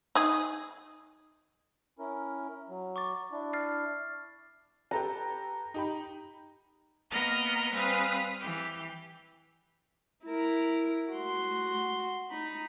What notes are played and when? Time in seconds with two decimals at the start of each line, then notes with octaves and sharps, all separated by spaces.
0.15 D#4 G#4
1.99 C#4 E4 A#4
2.69 F#3
2.96 C#6 D6 A6
3.32 D4 E4
3.53 F6 A6 C7
4.91 G4 A4 B4 A#5
5.74 D#4 G4 B5
7.10 A#3 B3 A#4 D#5 F6 A#6
7.73 G3 C4 B4 F5 G#5 D#6
8.39 E3 G4
10.25 E4 A#4
11.11 F#4 C6
12.30 D#4 B5